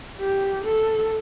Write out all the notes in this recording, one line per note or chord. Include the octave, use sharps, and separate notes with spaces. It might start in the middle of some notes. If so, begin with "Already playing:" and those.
G4
A4